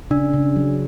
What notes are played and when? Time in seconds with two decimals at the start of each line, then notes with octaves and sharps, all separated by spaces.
0.11 C#3 D4
0.34 C#3
0.56 F#3